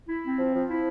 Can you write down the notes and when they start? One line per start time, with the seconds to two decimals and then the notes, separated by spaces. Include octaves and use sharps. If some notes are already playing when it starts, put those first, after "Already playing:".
0.08 E4
0.24 C4
0.38 F3
0.54 F3
0.69 E4